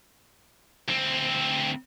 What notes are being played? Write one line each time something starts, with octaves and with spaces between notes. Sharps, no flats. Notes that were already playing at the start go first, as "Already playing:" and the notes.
D2 C4